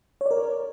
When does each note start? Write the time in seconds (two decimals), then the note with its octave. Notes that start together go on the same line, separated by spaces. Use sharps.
0.21 C#5
0.26 D5
0.31 A#4